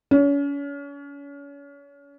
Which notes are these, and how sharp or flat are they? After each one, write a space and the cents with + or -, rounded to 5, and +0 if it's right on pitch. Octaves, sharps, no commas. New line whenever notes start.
C#4 +35